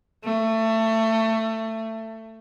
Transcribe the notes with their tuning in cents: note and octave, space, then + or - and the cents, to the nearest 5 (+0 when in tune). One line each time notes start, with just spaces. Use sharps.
A3 +20